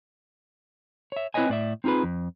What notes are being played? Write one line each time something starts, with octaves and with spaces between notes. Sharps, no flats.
C#5 E5
C4 E4 B4 C#5 D#5 G#5
A2 D5 E5
C4 D#4 F4 G#4 B4
F2